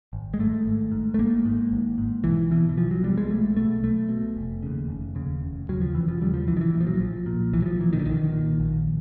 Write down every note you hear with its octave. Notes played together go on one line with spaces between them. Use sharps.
G#1
G#3
G#2 A3
G#1
G#2
A3
G#1 A#3
G#2
G#1
G#2
B1 E3
B2 E3
E3
B1 F3
F#3
B2 G3
G#3
B1 A3
B2 A3
B1 A3
B2
F1
D#2 C#3
F1
D#2 C#3
F1
D#2 C#3 F#3
F3
F1 E3
F3
D#2 C#3 G3
F3
B1 E3
D#3
E3
A#2
F3
F#3
B1 F3
A#2
B1 E3
F#3
F3
A#2 E3
D#3
D3
B1 D#3
A#2
A#1